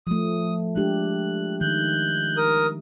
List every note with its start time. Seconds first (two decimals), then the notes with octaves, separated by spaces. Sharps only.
0.07 F3 A3 D#6
0.76 G#3 D4 G4 F#6
1.61 D#3 F#6 G6
2.37 A#4 D#6